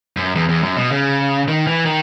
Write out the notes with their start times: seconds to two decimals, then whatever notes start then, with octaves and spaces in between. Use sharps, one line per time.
0.17 F#2
0.35 E2
0.48 E2
0.63 F#2
0.77 B2
0.91 C#3
1.48 D#3
1.67 E3
1.86 D#3